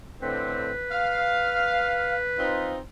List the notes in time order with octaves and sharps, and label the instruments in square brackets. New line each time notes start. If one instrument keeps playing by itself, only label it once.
[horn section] A2 D3 C4 [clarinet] B4
[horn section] F5
C4 D#4 F4